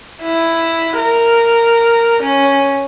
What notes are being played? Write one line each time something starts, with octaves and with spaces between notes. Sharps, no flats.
E4
A#4
C#4